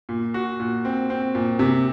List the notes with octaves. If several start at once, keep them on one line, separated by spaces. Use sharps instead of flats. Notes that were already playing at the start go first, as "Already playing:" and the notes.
A#2
F#4
A#2
C4
C4
A#2
C3